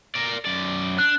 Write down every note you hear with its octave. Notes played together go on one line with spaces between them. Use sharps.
A#4 D5
F#2 D5
D4 F#6